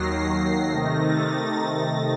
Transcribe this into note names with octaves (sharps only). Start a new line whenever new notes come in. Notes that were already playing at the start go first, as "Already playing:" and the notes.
Already playing: D#2 D#3 F#3 A#6 C7
C7
C3 D#3 A3 D#4 A#6
A6
A#6